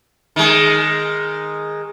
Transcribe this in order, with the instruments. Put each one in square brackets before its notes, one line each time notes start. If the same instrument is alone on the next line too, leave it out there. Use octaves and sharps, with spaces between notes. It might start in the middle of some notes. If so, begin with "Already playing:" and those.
[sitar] D#3 G#3